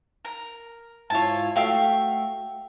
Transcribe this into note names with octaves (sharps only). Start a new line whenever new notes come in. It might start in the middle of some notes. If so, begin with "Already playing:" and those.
A#4
G#2 E4 F4 C#5 A5
A3 F#4 E5 F5 G5